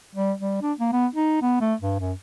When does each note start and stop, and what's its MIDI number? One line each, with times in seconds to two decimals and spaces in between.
0.15 0.32 55
0.40 0.57 55
0.62 0.72 62
0.79 0.92 58
0.92 1.07 59
1.15 1.41 63
1.42 1.59 59
1.61 1.74 57
1.81 1.96 43
1.99 2.13 42